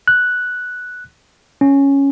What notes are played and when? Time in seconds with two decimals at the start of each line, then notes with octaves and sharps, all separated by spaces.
0.08 F#6
1.61 C#4